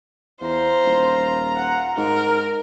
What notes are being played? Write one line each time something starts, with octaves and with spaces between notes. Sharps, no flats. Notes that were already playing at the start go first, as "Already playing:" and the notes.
E2 F4 C5 A#5
D#1
F#5
G#2 A#4